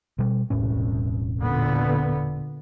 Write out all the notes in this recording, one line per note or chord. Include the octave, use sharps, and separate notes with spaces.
B2 G3
E1 C2 A2 C#4
A#2 D3 B3